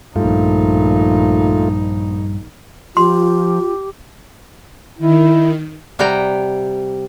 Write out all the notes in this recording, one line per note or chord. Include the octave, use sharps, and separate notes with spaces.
A#1 G2 A3 D#4 F4
F3 F4 G4 C6
D#3 E4
C3 G3 F#5 G5 A#5